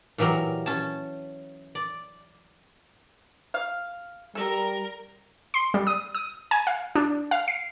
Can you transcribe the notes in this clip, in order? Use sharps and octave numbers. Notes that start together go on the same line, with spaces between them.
A#2 E3 F#3 G3 A#4
C#4 A5
D5
F5
G3 A4 A#4
C6
G3
D#6
D#6
G#5
F5
D4
F5
C7